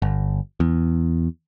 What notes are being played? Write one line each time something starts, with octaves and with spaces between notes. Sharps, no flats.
G1
E2